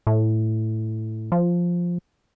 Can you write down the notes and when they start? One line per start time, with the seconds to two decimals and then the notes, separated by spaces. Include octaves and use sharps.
0.07 A2
1.32 F3